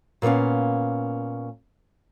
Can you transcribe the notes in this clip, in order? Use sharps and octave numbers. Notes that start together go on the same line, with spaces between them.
A#2 A#3 B3 C#4 F5